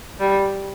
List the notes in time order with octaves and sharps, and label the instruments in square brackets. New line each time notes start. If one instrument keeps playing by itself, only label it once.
[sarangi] G3